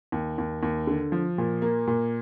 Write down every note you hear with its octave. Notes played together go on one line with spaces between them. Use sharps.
D#2
D#2
D#2
D3
F3
A#2
A#3
A#2